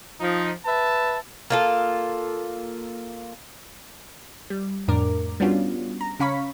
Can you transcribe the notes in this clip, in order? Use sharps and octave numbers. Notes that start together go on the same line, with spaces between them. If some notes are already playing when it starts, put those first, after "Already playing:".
F3 D#4
B4 E5 A5
A#3 F4 A4
G3
F2 A2 D4 A#4 D6
G3 B3 C#4 D4 F4 F#4
A#5
C#3 C#4 F5 B5 C#6 B6